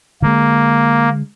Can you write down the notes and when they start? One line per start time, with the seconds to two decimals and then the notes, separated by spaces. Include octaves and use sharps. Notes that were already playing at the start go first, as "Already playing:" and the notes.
0.22 D3 G#3 A#3